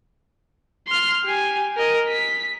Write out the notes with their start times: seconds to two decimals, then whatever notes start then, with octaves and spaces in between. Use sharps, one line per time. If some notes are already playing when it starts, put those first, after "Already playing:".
0.88 C6 F6
1.24 G4 G#5
1.77 A#4 D#5
2.09 B6